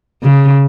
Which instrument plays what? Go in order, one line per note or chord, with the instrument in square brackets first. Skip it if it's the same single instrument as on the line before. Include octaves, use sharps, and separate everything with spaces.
[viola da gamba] C#3